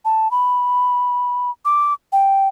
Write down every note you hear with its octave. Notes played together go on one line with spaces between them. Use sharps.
A5
B5
D6
G5